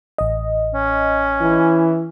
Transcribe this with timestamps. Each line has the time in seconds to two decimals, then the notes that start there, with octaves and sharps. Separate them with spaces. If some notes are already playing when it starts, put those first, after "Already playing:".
0.18 A1 D#5
0.74 C#4
1.42 E3